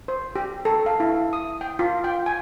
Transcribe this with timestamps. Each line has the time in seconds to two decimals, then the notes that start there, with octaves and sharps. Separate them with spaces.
0.08 C5
0.36 G4
0.65 A4
0.86 F5
1.00 E4
1.33 D#6
1.61 G5
1.79 F4
2.04 G5
2.26 G#5